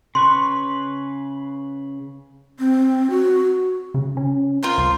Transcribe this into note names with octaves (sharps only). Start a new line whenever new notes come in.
C#3 B4 C6 C#6
C4
F#4
C#3
C#4
F4 A#4 C5
C#2